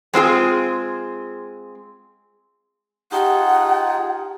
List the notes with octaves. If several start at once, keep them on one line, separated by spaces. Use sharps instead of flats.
G#3 C4 F4 G#4
D#4 F4 G4 G#4 F#5 G5 A5